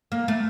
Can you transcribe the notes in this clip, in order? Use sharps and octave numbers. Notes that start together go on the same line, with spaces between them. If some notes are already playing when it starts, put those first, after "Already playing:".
A#3
A3